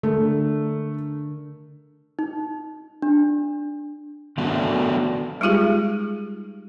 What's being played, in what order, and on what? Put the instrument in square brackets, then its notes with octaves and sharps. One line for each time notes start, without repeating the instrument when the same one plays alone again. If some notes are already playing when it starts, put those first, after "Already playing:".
[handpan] D3 A#4 [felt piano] A3
[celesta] D#4
D4
[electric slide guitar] D#3 F#3 A3 B3 D4 F#4
[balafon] G3 G#3 D#4 F4 G4 G#4